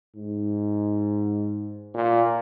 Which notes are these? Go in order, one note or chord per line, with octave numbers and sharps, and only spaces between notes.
G#2
A#2